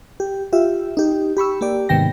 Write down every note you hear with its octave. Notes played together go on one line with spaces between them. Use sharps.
G4
F4 G4 E5
D#4 G4
G4 B5 C#6 E6
A#3 G4 D5
G#2 C3 D#3 B3 G5 A#6